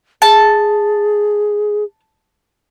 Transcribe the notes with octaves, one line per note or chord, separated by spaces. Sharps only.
G#4 A5